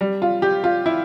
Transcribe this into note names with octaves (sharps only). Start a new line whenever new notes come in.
G3
F4
G4
F4
E4